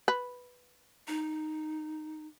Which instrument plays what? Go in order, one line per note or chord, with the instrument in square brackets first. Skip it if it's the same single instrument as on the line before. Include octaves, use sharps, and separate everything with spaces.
[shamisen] B4
[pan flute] D#4